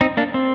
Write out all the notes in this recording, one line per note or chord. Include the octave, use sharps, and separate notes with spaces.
C4 D#4
A#3 D4
C4